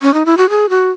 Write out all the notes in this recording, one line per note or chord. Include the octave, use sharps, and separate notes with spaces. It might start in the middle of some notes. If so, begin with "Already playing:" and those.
C#4
D#4
E4
F#4
G#4
F#4